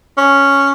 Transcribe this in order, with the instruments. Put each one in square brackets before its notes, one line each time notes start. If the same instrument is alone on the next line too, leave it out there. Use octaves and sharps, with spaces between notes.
[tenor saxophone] C#4